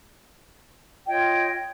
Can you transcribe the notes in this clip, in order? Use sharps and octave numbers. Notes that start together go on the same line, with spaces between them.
F4 C#5 D#5 G5